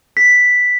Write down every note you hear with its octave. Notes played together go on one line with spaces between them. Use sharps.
B6